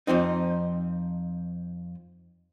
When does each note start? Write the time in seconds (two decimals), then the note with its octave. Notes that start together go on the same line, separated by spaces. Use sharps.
0.07 F2 F3 C4 D#4